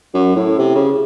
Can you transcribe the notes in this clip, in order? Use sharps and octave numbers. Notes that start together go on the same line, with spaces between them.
F#2
A2
C3
C#3